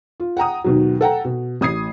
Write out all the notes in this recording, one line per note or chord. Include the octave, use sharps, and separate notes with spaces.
F4
F#5 G5 A#5 D#6
D#2 B2 F#3
A4 F#5 G5 A#5
B2
A1 D#6 G#6 C7